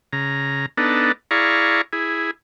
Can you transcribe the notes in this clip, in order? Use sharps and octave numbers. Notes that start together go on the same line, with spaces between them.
C#3 A#5
B3 D4 D#4 A4
E4 G#4 D5 F5 A#5 C#6
E4 G#4